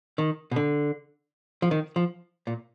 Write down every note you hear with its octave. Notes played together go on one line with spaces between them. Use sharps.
D#3
B2
D3
F3
D#3
F3
A#2